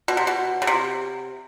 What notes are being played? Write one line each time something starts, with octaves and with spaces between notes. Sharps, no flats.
B2
C3
B2
C#3
C3